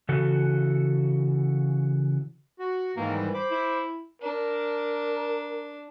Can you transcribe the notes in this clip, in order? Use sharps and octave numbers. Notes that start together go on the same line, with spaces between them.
C#3 E3 F#4 A4
F#4
G#2 D#3 E3 A#3
G3
C5 B5 D6
E4
D4 A#4